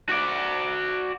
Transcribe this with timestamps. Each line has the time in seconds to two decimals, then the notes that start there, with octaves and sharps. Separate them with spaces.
0.09 F#4 D5